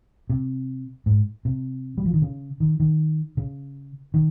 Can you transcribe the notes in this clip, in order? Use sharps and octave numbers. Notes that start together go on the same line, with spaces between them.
C3
G#2
C3
G3
F3
D#3
C#3
D#3
D#3
C#3
D#3